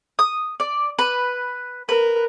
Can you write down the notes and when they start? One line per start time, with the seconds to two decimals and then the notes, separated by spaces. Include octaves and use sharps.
0.19 D#6
0.60 D5
0.99 B4
1.89 A#4 B4